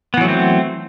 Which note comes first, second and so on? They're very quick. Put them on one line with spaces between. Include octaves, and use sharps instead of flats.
B3 E3 F#3 A3 C4